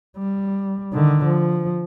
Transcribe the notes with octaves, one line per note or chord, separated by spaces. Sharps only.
G3
D3 D#3
F3